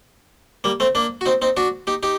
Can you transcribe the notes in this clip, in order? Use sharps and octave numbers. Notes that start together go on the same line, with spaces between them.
G3 A#3
A3 C4
A#3 D4
F#4
C4 D#4
C4 D#4
D4 F#4
D#4 G4
D#4 G4